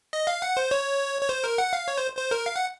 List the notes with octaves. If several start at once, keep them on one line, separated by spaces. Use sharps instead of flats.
D#5
F5
F#5
C5
C#5
C#5
C5
A#4
F#5
F5
C#5
C5
C5
A#4
F5
F#5